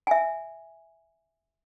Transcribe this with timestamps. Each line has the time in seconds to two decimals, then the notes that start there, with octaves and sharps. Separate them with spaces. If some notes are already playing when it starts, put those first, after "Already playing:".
0.07 E5 G#5